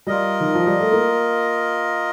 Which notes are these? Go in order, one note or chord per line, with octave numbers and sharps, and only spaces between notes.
G3 F4 A#4 D#5
D#3
F3
G3
A3
A#3